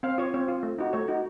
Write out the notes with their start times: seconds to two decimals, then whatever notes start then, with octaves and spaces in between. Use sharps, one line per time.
0.03 C4 F5
0.18 F4 C#5
0.34 C4 C#5
0.48 F4
0.63 A3
0.79 D#4 F#4
0.93 A3 C#5
1.08 D#4 F#4